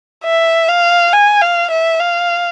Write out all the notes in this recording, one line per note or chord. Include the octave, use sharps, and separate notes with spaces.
E5
F5
G#5
F5
E5
F5